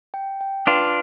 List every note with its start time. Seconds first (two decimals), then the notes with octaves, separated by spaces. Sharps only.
0.14 G5
0.41 G5
0.67 D4 F4 B4